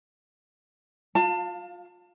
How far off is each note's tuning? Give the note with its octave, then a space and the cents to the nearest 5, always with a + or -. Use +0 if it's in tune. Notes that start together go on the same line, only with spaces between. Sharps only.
F4 +30 F5 +0 A5 +30